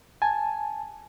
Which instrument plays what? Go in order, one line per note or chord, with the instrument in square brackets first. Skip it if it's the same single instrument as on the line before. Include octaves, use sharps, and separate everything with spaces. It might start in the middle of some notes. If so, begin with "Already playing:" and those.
[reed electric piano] G#5 A5